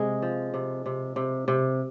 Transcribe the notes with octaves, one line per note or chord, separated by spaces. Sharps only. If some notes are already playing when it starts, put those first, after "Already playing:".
Already playing: C3 G#3 G#4
F3
C3
C3
C3
C3